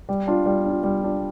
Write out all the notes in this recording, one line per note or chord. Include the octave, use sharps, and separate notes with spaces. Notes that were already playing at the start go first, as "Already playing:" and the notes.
G3
D4 F4
G3
D4 F4
G3
D4 F4